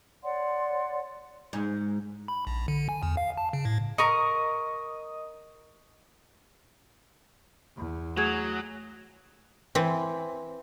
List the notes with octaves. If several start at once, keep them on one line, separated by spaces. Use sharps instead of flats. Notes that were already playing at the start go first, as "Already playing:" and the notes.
C#5 D5 F#5 C6
G#2
B5
A#1
D3
G#5
E2
F5
A5
C#3
A2
A#4 D#5 C#6 D#6
E2
F#3 A3 F#4 G#4 G#6
E3 C4